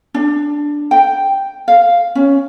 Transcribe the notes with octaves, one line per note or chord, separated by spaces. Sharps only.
D4
G5
F5
C#4